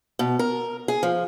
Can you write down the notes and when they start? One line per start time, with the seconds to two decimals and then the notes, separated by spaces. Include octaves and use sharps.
0.19 B2
0.39 A#4
0.88 G#4
1.03 F3